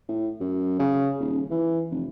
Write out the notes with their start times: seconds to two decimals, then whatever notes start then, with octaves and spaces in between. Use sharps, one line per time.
0.09 A2
0.40 F#2
0.79 C#3
1.20 D#1
1.50 E3
1.91 F1